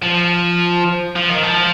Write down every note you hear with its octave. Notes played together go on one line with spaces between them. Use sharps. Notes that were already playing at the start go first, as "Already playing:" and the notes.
F3
F3
D#3
F3